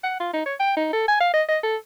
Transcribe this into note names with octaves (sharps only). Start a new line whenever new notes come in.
F#5
F4
D#4
C#5
G5
D#4
A4
G#5
F5
D#5
D#5
A4